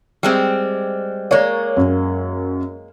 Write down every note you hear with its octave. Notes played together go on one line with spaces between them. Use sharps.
G3 G#3 C4
G#3 A#3 C#5 D5
F#2